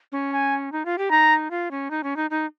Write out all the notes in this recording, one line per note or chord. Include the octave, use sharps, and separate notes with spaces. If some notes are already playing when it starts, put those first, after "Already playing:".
C#4
G#5
D#4
F4
G4
D#4 A#5
F4
C#4
D#4
C#4
D#4
D#4